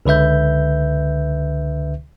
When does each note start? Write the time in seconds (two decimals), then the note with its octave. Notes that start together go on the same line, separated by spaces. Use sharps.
0.06 C#2 D3 B4 E5 G6